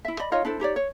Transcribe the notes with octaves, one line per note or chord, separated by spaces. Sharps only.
E4 E5
D5 D#5 B5
D#4 F4 C#5 D#5
D4 E4 A4 C5
D#4 G4 C#5 D5
C#5